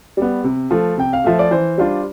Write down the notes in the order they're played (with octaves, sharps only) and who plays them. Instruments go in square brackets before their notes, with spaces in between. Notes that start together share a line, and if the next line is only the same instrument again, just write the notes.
[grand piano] G3 B3
C3
F3 A3
C3 G5
F5
F3 A3 E5
D5
E3 C5
G3 D4 F4